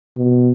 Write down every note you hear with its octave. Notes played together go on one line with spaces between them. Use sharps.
B2